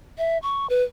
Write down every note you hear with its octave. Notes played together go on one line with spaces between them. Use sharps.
E5
C#6
B4